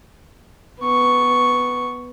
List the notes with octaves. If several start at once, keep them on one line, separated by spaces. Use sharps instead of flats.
B3 C#6